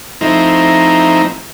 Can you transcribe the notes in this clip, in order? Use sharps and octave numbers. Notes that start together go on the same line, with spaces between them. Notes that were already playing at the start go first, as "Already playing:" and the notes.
F3 A3 C4 D#4 E4 A#5